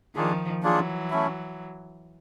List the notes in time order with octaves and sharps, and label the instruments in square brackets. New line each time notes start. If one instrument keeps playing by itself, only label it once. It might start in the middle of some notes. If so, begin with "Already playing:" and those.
[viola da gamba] D#3 F3 [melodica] A#3 D4 F4 G#4
[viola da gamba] E3 F#3 [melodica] A#3 D4 F4 G#4
[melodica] A3 C#4 E4